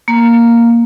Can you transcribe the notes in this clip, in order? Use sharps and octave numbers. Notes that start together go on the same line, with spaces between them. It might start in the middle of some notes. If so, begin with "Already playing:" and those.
A#3